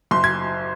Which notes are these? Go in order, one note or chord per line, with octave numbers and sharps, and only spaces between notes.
F#1 C6
G#6